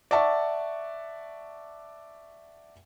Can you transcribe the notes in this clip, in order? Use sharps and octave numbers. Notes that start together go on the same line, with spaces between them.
D5 E5 F#5 A5 C#6